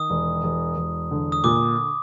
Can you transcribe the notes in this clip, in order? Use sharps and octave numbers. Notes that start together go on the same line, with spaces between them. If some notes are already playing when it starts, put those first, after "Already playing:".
Already playing: D#3 D#6
E1
E1
E1
D3
D#6
A#2 D6